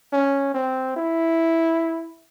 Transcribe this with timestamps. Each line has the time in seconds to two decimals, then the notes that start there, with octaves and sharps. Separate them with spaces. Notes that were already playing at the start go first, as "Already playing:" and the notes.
0.13 C#4
0.54 C4
0.97 E4